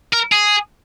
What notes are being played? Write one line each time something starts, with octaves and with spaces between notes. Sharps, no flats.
A#4
G#4